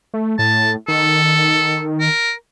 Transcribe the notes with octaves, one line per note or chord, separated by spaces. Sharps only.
A3
A2 A5
D#3 A4
A#4